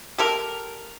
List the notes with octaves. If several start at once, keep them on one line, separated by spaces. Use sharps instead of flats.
G4 A4 A#4